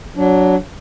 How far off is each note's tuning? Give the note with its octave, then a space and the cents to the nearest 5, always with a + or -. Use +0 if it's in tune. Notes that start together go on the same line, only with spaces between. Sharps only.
F#3 +0 D4 -20